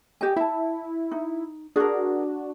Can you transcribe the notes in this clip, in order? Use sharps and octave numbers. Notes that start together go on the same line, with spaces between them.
G4 D#5 G#5
E4 E5 A5
D#4
D4 F#4 G#4 A#4